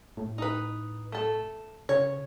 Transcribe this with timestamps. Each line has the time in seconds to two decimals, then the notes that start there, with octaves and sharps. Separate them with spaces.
0.17 A2
0.38 D#4 B4
1.12 A3 A4
1.89 C#3 C#5